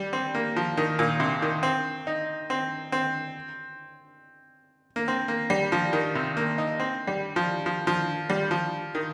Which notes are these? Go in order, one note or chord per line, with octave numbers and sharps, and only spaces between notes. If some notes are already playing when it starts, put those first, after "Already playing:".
Already playing: G3
C4
A#3
F3
D#3
A#2
C3
D#3
C4
D#4
C4
C4
A#3
C4
A#3
G3
F3
D#3
C3
A#3
D#4
C4
G3
F3
F3
F3
G3
F3
D#3